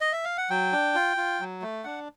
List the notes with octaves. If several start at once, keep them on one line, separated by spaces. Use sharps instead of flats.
D#5
E5
F5
F#5
F#3 G5
D4
F4
F4
F#3
A3
D4 F#5